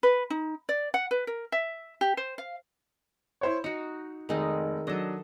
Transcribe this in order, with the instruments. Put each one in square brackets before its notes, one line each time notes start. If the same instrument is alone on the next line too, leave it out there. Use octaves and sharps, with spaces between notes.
[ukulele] B4
D#4
D5
F#5
B4
A#4
E5
G4
C5
F5
[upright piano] E4 C5 C#5
[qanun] D#4 F#4 [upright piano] C#7
[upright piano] F1 [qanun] D#3 G#3 D#4
[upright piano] F#3 D4 [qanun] A4 D#5